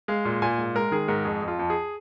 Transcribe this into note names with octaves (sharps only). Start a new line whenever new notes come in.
G#3 F5
A#2
A#2 G#5
G#2
G#3 A#4
D#3 G#4
G#2 A#4
F2 G#4
F2
F4
F2
G#4